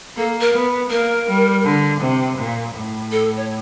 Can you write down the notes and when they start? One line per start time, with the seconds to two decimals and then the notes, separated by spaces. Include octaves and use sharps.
0.16 A#3 A4
0.41 A#4
0.54 B3
0.90 A#3 A#4
1.27 G3
1.65 D3
2.01 C3
2.39 A#2
2.75 A2
3.12 A4
3.37 C#5